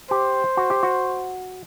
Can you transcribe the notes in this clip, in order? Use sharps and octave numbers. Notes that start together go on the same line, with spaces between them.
G4 C5
F#4
G4
F#4